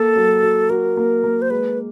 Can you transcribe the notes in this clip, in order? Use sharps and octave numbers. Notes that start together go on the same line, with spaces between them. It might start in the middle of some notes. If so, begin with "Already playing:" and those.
Already playing: A#3 A4
F#3
F#4
F#4 A#4
A#3
A#3
C5
G#3 B4